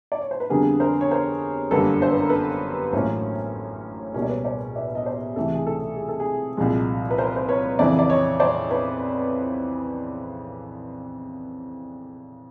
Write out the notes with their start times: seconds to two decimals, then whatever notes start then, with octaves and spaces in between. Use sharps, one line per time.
0.12 D5
0.21 C#5
0.31 C5
0.40 B4
0.50 F2 D3 G3 B3 G#4 A#4
0.80 A#4 C5
1.01 C#5
1.11 A#4 C5
1.71 G1 F#2 D3 G3 A#3 A4 B4
2.02 C5
2.12 B4
2.21 A#4
2.30 A4 B4
2.92 A1 A2 F#3 A#3 C#4 A#4 C5
4.14 C#2 B2 G3 A#3 C#4 C#5
4.22 D5
4.29 B4 C#5
4.45 C5 D5
4.75 D5 E5
4.95 D#5
5.06 C5 D5
5.35 C#2 C3 E3 A3 A4
5.54 G#4
5.67 A4
5.96 G#4
6.09 A4
6.20 G#4
6.57 C2 A#2 F3 G#3
7.11 B4
7.18 A#4 C5
7.36 C5
7.48 B4 C#5
7.79 F2 C#3 E3 C5 D5
7.99 D5
8.09 C#5 D#5
8.40 C5 D5
8.70 B4 C#5